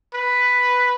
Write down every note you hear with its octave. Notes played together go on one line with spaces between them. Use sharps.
B4